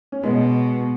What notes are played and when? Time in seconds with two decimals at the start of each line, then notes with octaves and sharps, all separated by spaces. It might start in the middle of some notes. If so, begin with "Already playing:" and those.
0.12 C#4
0.24 B2 G#3 B3